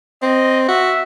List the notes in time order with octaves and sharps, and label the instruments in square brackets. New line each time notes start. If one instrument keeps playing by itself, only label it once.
[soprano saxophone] C4 [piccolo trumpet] D#5
[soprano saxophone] F#4 [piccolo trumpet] E5